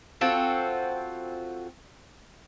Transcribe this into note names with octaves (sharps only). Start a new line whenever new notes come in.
C4 F4 F#4 A4